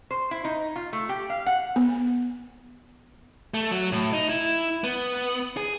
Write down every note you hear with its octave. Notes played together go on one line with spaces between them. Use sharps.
C5
E4
D#4
F4
A3
G4
F5
F#5
B3
A3
F#3
A2
D#4
E4
B3
G#4